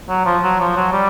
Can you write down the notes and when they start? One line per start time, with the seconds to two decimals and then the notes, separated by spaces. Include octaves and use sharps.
0.09 F#3
0.25 F3
0.43 F#3
0.60 F3
0.76 F#3
0.93 G3